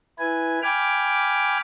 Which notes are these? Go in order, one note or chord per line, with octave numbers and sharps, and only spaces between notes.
E4 B4 G#5
G5 G#5 B5 D6 F6